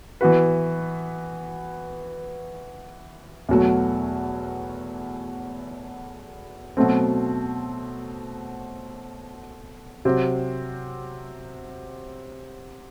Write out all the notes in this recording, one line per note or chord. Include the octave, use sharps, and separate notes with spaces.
E3 B3 F#4 B4
E2 B2 F#3 A3
B2 F#3 A3 C4
C3 F#3 C4